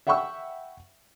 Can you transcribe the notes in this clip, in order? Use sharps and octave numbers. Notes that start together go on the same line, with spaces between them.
E5 F#5 G5 B5 C#6 E6